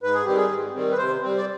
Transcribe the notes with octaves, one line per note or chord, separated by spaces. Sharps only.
G#2 B4
G#4
D#3 G3 C4 G4
G#4
G#2
D#3 G3 C4
B4
C3 C5
G3 C4
D5